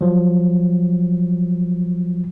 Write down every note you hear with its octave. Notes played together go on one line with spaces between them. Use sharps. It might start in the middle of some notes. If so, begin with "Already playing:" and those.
F3 F#3